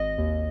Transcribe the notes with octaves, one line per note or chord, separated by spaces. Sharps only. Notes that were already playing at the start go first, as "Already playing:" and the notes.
Already playing: G#1 D#5
D#2